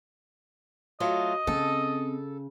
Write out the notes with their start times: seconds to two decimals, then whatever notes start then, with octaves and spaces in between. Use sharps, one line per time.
1.00 F#3 A3 F4 D#5
1.47 C#3 C4 A4